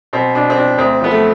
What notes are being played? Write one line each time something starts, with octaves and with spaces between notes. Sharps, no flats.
B2 C4
B2 D4
C4
B2 D4
D2 C4
F3 B3
A3